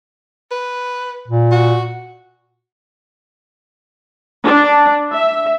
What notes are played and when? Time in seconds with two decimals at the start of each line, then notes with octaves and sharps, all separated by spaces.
0.51 B4
1.28 A#2
1.51 F#4
4.45 D4
5.13 E5